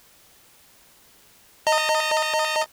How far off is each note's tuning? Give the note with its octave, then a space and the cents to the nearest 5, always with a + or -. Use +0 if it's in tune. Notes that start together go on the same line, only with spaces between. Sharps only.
D#5 +0 A#5 -45